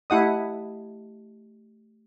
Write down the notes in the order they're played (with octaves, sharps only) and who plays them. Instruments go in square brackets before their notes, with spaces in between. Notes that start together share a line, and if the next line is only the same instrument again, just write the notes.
[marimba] A3 G4 D#5 [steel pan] E4 F#5 D#6